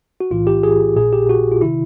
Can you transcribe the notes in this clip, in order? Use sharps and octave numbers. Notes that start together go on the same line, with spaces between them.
F#4
B1 A2 E3 F4
G4
G#4
A#1 A#2 G#4
G4
F#4
F4
C3 D#3 E4